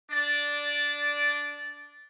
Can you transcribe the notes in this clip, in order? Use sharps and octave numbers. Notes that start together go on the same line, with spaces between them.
D4 D5